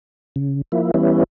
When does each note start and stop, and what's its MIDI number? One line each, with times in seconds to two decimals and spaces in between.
0.36 0.62 49
0.72 0.91 53
0.72 0.91 58
0.72 0.91 64
0.94 1.24 52
0.94 1.24 55
0.94 1.24 59
0.94 1.24 61
0.94 1.24 64